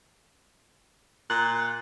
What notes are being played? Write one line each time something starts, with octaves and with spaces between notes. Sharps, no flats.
A#2 F#6